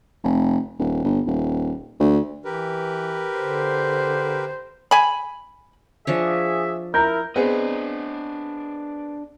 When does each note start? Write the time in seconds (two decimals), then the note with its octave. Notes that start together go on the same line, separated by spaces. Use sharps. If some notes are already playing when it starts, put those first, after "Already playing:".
0.24 F1
0.79 D#1
1.04 G1
1.26 D#1
2.00 D2
2.45 E3 G4 A#4 B4
3.40 D3 C5
4.91 G#5 B5
6.07 F3 D4 G#4 C#5 E5
6.94 E4 A#4 A#5 G6
7.36 B3 C4 D4 G#4 D#5